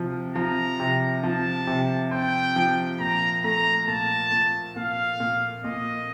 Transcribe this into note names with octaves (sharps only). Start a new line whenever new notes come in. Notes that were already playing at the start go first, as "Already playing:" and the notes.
Already playing: C3 F3
F3 A#5
C3
F3 A5
C3
C4 G5
F3
A#2 A#5
A3 A#5
A#2 A5
A#2
A#2 F5
A#2
A#2 D#5